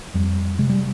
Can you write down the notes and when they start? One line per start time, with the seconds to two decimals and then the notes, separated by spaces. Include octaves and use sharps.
0.14 F2 G3
0.59 C3 G#3
0.69 G3